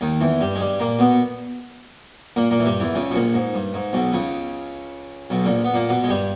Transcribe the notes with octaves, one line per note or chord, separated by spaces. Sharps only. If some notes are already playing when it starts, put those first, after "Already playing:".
D#2 D#3
E2 E3
G2 G3
G#3
G2 G3
A#2 A#3
B2 B3
A#2 A#3
A#2 A#3
E3
G2 G3
E2 E3
C#2 C#3
B2
A#1 A#2
G#2
G2
G#2
B1 B2
C#2 C#3
B1 B2
A#1 A#2
B3
A#2 A#3
B2 B3
G#3
G2 G3